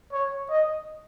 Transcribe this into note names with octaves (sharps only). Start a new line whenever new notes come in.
C#5
D#5